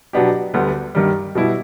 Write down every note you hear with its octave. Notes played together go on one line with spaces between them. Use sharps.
B2 F#3 B3 D4 G4
D2 D3 G3 B3
G2 D#3 G3
B2 G3 B3 E4